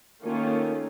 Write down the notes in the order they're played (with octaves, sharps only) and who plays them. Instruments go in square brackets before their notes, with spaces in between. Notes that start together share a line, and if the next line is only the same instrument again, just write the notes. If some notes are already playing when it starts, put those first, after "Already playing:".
[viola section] D#3 A3 A#3 C#4 F4